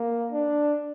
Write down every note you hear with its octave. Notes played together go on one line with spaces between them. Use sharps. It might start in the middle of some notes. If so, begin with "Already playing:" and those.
Already playing: A#3
D4